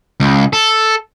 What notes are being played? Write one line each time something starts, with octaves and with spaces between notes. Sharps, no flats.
C#2
A4